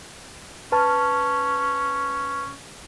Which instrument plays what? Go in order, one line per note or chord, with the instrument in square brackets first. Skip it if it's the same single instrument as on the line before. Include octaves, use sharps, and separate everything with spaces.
[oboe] C#4 [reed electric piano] B4 A5 F6